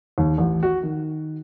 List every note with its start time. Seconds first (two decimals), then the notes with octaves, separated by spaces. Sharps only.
0.18 D#2
0.38 A1
0.63 F#4
0.83 D#3